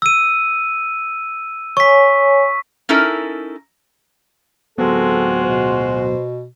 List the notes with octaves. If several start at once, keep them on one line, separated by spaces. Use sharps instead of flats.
E6 D#7
C#5 G#5 C#6 B6
C#4 D#4 E4 A4 A#4
D1 F#3 G#3 B3 C4 F4 F#4 A4
B2 C5